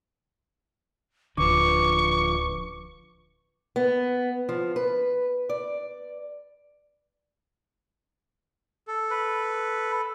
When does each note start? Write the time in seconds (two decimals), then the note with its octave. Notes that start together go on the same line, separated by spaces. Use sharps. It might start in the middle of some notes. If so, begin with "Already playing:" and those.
1.37 D1 D3 F3 C#4 B4 C#6 D6
3.76 B3
4.49 F3
4.76 B4
5.49 D5
8.88 A4
9.10 B4